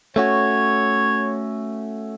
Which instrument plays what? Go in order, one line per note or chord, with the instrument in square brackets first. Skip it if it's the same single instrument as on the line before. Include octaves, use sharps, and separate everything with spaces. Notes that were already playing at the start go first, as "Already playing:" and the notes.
[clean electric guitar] A3 C#4 F#4 [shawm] C#5